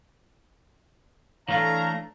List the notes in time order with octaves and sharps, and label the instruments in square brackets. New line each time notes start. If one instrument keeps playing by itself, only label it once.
[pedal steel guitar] E3 A3 D4 [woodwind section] A4 C#5 A#5 [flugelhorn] F5